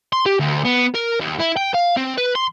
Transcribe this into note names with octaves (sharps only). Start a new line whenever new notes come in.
C6
G4
D2
B3
A#4
D#2
E4
G5
F5
C4
B4
C6